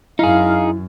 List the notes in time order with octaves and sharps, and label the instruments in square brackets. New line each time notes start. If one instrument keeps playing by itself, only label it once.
[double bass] F#2 [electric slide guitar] D#4 G#4 [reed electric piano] E4 [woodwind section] F5